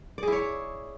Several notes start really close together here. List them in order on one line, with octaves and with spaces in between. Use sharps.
D5 G#4 E4 C#5